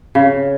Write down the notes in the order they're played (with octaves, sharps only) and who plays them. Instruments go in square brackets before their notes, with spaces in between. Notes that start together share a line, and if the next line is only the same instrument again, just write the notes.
[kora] C#3